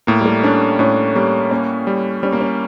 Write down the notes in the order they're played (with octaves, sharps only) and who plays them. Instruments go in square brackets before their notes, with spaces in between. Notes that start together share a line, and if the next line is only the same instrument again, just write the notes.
[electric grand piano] A2 [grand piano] A#3
[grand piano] G3
A3
[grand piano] C#4 [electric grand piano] D4
[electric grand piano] A2 [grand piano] C#4
[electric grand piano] G3 [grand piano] A#3
[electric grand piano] A#3 [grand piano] C#4
[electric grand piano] G3
[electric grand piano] G3 [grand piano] C#4
[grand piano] A#3
C#4